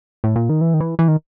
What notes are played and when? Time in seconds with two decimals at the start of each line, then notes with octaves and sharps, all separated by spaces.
0.24 A2
0.36 A#2
0.49 D#3
0.61 E3
0.74 D#3
0.80 E3
0.99 E3
1.08 D#3